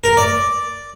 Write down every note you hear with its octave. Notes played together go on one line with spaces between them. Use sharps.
A#4
D5